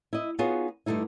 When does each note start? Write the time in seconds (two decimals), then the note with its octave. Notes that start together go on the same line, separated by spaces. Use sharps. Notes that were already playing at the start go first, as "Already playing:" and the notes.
0.13 E4 D#5
0.39 B3 D#4 F4 F#4 G#4 C#5
0.86 G2 D3 A3 D#4 E4